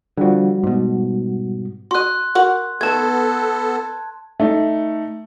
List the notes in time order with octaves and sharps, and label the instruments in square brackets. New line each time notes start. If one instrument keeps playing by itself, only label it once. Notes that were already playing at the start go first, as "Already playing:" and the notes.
[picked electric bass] D3 F3 [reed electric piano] G3 F#4
[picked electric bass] G#2 B2
[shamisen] F#4 D#5 [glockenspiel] C6 F#6
[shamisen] F#4 A#4 F#5
[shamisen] D#3 A3 [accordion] B3 A4 [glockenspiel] A5 G#6
[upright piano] A3 D#4